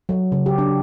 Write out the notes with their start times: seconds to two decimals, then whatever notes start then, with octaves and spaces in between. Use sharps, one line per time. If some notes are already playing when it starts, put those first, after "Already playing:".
0.09 F#3
0.32 C#3
0.46 G4
0.58 D4